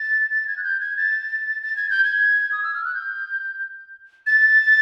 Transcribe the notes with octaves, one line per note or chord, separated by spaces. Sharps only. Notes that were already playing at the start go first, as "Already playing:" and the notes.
Already playing: A6
A6
G#6
F#6
G6
G#6
A6
A6
G#6
G6
G#6
D#6
E6
F6
F#6
G6
A6